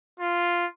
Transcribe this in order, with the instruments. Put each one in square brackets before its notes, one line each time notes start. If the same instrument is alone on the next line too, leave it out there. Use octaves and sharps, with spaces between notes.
[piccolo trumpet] F4